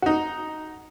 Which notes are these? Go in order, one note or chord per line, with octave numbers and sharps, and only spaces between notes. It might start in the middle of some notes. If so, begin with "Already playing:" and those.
D#4 F#4